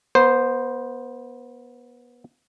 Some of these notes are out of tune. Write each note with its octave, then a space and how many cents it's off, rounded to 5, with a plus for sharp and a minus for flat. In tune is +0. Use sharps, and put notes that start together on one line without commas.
B3 -30 C5 +0